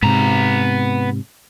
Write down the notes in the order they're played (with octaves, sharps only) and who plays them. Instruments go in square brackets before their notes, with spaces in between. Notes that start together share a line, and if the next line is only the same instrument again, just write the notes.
[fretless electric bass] G#2 C3 [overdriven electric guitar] B3 A#5